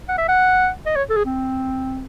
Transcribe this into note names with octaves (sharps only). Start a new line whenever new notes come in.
F#5
E5
F#5
D#5
C#5
A4
G#4
C4